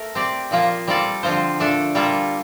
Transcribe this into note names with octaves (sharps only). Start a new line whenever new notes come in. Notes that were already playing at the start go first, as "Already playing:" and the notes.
Already playing: A3 A#4
C4 G4 D5
A#2 F3 A#3 F4
G3 C4 F4 A4 D5
D3 F3 C4 F4 C5
A#2 A3 D4 A4
G3 A#3 F4 A4